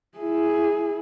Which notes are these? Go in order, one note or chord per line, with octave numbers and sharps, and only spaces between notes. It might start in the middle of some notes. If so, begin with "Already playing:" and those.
E4 G#4